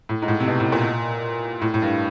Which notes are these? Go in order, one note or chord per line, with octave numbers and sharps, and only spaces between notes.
A2
G#2
A2
C3
B2
A2
A#2
A2
A2
G2